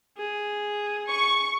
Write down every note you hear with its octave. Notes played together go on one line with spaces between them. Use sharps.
G#4
C#6